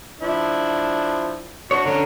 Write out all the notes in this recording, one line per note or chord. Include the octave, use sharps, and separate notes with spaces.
F3 D4 E4
D4 F#4 C#5 C#6
D3 C#4 D4 C#5 A#5